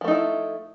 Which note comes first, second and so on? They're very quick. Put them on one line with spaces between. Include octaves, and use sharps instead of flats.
F3 A3 D#4 E4